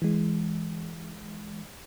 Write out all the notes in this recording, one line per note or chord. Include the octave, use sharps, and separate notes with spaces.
E3 G#3